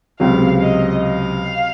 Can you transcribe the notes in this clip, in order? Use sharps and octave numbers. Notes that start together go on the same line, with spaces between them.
C#2 C3 F#3 F5
D#5
F5